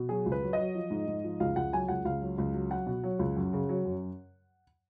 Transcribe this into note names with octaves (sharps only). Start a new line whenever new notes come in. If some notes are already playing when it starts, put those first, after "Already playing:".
Already playing: B2
F#3 G#4
C#2
B4
F#3
D#5
F#3
F3
G#2
G#2
F3
C#2 F5
C#2 F#5
F#3 G#5
C#2 F#5
C#2 F5
F#3
C#2
F#3
F#3 F#5
B2
F#3
C#2
F#2
C#3
F#3
F#2